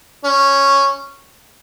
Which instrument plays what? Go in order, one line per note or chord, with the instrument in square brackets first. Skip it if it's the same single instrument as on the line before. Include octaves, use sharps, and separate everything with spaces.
[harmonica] C#4